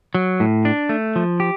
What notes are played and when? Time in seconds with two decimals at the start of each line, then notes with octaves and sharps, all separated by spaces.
0.15 F#3
0.40 A2
0.65 D4
0.89 A3
1.16 F3
1.40 G4